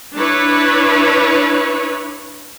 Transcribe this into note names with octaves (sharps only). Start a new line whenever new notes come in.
D4 E4 B4 C#5